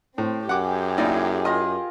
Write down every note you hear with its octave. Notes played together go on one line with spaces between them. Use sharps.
A2 C4
F#2 G4 G#4 F#5 D6
A#3 D#4 E4 D5
F4 A#4 D#5 G#5